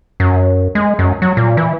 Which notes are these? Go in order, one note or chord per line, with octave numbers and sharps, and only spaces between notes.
F#2
G#3
F#2
F#3
A#2
E3